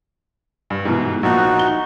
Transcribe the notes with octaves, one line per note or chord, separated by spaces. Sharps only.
G2
G#2 B2 E3
A#1 F3 D#4 F#4 F#6
G7